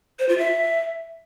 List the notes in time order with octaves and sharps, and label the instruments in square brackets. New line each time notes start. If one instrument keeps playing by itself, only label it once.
[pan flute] C5
F4
E5